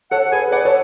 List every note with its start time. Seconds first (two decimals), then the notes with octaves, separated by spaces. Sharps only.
0.11 A4 C#5 F#5
0.32 G#4 B4 G#5
0.51 B4 D5 F#5
0.65 A4 C#5